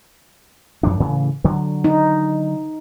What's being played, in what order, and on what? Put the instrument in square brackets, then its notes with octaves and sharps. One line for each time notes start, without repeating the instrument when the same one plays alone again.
[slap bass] F#2 F3 D4
A2 C#3 E3
D3 F#3
[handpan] D#4